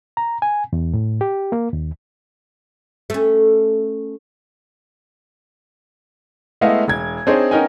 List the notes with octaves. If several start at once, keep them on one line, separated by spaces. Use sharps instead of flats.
A#5
G#5
E2
A2
G4
A#3
D#2
A3 C#4
G#3 A3 B3 E4 D#5 F5
E1 G#6
C4 D4 D#4 G#4 C5 C#5
B3 C#4 D#4 A#4 G5 G#5